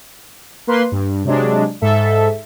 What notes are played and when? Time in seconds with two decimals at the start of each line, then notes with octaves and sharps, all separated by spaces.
0.67 A#3 B4 C6
0.92 G2
1.24 C3 F#3 G#3 D4
1.81 G#2 A4 E5